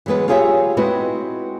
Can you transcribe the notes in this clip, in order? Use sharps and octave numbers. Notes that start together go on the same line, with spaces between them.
E3 F#3 G#3 B3 B4
F4 G4 G#4 C#5 D5 E5
G#3 C4 E4 F#4 B4 D#5